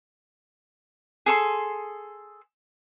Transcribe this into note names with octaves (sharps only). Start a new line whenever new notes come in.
G#4 A4 C6